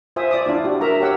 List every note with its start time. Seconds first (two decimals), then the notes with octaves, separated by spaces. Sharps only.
0.16 F4 C5 E5 G#5 D#6
0.31 D5 D6 D#6
0.46 D4 E4 F4
0.64 F#4 G4
0.81 A#4 E5 A#5
1.00 G4 C#5 F#5 E6